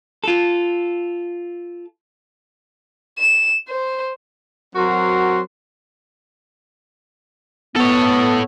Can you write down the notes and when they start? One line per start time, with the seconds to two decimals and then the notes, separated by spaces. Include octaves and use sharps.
0.24 F4 A4
3.19 E7
3.68 C5
4.75 F#3 C4 F#4 A#4 C6
7.76 B3 A4 C#5